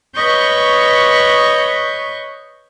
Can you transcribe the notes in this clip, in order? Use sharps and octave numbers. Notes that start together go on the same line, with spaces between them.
B4 C#5 D#5 C#6 G6